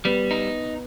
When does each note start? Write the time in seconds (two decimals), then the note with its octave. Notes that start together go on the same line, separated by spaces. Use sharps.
0.05 G3 B3
0.31 D#4